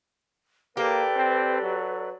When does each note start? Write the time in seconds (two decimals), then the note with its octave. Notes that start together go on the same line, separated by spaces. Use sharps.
0.77 A#3 G4 A4 B4 D5
1.16 C4
1.62 F#3